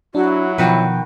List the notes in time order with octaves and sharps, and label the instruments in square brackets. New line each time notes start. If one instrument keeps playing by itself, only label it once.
[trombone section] F#3 E4 [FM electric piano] D4 [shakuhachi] F#4
[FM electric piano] B2 F3 [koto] D#3 F#4 B4 [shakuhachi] G5